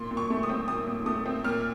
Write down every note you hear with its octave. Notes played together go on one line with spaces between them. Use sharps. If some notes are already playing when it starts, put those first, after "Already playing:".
Already playing: A#2 C6
A#2
C#6
A3
D#6
C4
A#2 D#6
A#2
A3 D#6
C4
A#2 F6